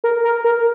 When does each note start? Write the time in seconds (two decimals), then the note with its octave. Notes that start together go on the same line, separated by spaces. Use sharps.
0.04 A#4
0.24 A#4
0.44 A#4